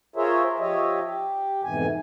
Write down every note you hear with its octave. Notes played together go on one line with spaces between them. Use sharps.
F4 G#4 A#4 C5 C#5 E5
F3 G4 C#5 D#5 E5
G4
F2 G#2 B2 E3 G#5